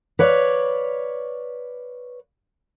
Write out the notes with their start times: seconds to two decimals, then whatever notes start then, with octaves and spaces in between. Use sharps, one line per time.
0.19 B4 C#5 D5 F5